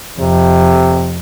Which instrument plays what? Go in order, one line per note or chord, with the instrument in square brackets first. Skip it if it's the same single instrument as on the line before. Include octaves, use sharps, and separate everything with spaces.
[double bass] F2 [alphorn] C3